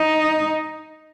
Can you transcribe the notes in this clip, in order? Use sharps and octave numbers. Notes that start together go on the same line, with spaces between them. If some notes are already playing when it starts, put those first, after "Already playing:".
Already playing: D#4